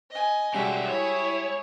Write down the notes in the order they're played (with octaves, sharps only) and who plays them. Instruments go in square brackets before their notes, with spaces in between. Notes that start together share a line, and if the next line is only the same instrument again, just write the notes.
[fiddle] D#5 G#5
[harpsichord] G3 G#3 F#4 [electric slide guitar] C#4 D5 F#5 [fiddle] E5
[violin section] E4 G#4 C#6 [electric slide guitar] C#5